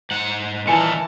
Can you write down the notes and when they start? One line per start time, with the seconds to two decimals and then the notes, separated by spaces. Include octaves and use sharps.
0.11 G#2 F#5
0.67 A#2 D#3 E3 G#5 A5 C#7